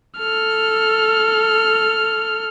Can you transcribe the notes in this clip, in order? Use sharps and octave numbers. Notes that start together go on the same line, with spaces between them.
A4 F6